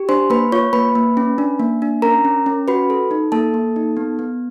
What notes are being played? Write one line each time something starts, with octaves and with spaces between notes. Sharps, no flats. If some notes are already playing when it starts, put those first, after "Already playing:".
Already playing: G4
D4 C5 C6
A#3 B4 B5
F4 C#5 C#6
A#3 B4 B5
A#3
C#4
D4
A#3
D4
C#4 A#4 A#5
C#4
C#4
F#4 B4 B5
A4
D#4
A#3 A4 A5
A#3
D#4
B3
B3